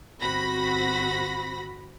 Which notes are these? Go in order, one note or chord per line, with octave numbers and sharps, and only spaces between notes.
G1 C4 F#4 B5 A#6